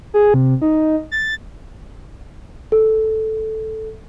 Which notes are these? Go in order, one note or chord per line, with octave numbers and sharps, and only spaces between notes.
G#4
C3
D#4
A6
A4